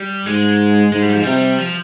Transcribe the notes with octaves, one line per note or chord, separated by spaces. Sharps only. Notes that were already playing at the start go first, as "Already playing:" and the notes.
Already playing: G3
G#2 G#3
G#2 G#3
G3
F3
C3 G3
F3